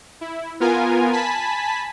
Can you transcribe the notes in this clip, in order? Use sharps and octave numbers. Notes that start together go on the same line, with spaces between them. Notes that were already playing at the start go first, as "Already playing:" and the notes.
E4
B3 F4 A#4 G#5
G#5 A5 B5 B6